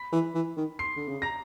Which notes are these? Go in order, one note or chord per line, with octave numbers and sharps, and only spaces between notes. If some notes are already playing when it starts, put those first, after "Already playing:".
Already playing: B5 B6
E3
E3
D#3
C6 C7
D3
C#3
A#5 A#6